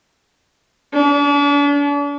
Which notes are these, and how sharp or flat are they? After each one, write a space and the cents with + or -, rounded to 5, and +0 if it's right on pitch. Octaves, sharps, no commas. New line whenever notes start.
D4 -40